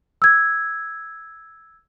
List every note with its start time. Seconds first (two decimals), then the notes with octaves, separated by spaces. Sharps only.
0.22 E6 G#6